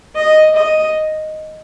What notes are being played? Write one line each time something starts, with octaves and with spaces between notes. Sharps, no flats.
D#5
D#5